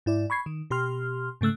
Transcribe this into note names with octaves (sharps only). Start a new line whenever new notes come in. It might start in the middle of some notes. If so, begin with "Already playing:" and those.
G#2 E4 D5
B5 C#6 G#6 C7
D#3
B2 G4 C6 F6
G#2 C#3 A3 E6 F#6